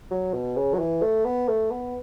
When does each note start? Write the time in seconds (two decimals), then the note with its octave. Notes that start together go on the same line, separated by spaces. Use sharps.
0.11 F#3
0.33 B2
0.57 C#3
0.74 F#3
0.79 E3
1.02 A3
1.25 B3
1.48 A3
1.71 B3